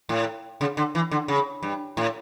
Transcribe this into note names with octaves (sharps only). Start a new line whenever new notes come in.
A2
C#3
D3
E3
D3
C#3
G2
A2